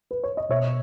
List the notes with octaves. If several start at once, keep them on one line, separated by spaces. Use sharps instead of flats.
B4
C#5
D#5
B2 C#5 E5